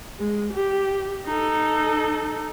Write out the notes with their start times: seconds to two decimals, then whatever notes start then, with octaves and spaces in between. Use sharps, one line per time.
0.19 G#3
0.53 G4
1.26 D#4 A4